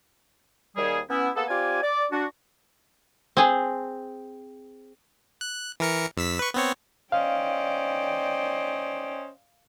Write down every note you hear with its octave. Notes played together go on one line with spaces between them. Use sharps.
D#2 G3 G#4
B3 C#4 E4
A#3 B3 G#4 A4
C4 F4 G4 D5 G#5
D5
D4 F#4
C4 G#4
F#6
E3 A#4 C#7
F2 E6 B6
B4 C#6
B3 C4 C#5
C#4 C5 D5 D#5 F5 G5